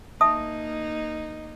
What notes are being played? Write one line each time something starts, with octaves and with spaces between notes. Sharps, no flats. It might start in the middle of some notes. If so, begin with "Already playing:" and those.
A#3 D#4 E5 A5 D#6